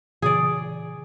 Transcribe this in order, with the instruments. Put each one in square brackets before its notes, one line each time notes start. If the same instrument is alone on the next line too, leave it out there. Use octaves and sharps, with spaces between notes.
[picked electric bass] A#2 C#3 E3 [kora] G#4 D5